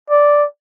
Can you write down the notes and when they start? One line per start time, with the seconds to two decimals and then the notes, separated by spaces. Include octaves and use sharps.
0.10 D5